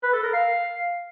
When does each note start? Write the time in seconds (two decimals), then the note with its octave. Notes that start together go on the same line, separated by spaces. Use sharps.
0.03 B4
0.13 A4
0.23 A#4
0.33 F5